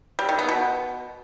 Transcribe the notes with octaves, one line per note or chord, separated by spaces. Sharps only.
G3
D#3
B3
B2